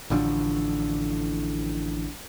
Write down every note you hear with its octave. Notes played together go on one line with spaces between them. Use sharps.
A1 A2 D3 F3